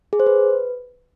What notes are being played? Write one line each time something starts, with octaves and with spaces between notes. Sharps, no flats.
G#4
C5
B4